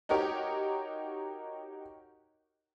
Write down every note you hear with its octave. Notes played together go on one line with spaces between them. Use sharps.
D#4 F#4 G4 A#4 C#5